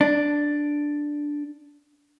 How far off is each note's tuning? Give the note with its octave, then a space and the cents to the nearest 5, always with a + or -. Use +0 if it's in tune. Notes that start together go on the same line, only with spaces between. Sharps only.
D4 +0